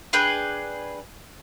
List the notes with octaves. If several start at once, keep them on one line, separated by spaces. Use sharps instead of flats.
D4 G#4 B4 G5